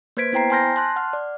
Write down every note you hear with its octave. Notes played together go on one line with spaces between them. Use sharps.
A#3 B4 C5 G#6 B6 D7
B3 E4 C5 G5 A#5 C7
G#5 A5 C6 F6 G6 A#6
A5 C6 F#6
F#5 F6
D5